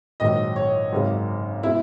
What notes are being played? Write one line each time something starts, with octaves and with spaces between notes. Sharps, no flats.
A#1 G#2 D#3 F#3 D#5
C#5
G#1 F#2 C#3 G#3
B2 G#3 E4